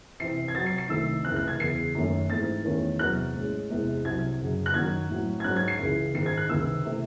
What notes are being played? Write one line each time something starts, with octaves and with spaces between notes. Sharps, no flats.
C3 E3 C4 C7
G#6
C3 F#3 C4 A6
C7
C7
C2 C3 D#3 A3 E6
C#2 C3 E3 A3 C4 F#6
F#6
G#6
E2 C#3 E3 C7
F#2 D#3 A3 C#4
G#2 E3 A3 C4 A6
E2 D#3 A3 C#4
E2 C3 F#3 F#6
A2 G#3 C#4
E2 C3 E3 G#3
C2 C3 F#3 G#6
F#2 C#3 F#3
F#6
F#2 D#3 F#3 G#6
A2 F#3 C4
G#6
G#2 F#3 C#4 F#6
G#6
C7
C#2 C#3 E3
G#2 D#3 G#3 C7
G#6
F#6
C#2 C3 D#3 E6
C3 E3 A3